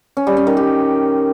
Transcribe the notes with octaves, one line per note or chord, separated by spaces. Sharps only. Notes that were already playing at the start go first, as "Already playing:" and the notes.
C#4
G3
C#4
D#3
G4